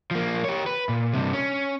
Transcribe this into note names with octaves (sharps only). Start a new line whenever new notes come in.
F3 A#3
G4 C#5
B4
A#2
G2 C3
C#4